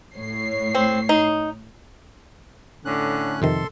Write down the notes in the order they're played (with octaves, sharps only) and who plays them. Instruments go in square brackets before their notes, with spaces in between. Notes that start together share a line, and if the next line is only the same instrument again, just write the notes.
[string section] A2 C#5 C7
[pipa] C4
D#4
[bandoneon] A2 C#4 F#6 [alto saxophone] D3
[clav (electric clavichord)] F2 C3 D#3 [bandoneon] A4 C6